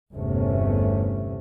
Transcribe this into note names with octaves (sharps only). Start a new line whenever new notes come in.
G1 E2 C3 A3 C#4